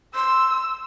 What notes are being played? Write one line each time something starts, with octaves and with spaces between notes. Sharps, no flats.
C6 E6